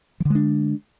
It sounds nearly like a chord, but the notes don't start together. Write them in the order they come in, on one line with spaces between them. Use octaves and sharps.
F3 D3 G#3 D4